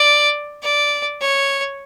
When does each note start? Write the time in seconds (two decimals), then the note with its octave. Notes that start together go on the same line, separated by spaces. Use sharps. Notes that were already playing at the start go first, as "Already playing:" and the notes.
Already playing: D5
0.63 D5
1.21 C#5